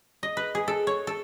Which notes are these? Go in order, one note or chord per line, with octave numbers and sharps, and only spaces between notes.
D#5
B4
G#4
A4
C#5
A4